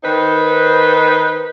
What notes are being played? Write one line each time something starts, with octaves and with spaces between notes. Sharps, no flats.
D#3 D#4 B4 C5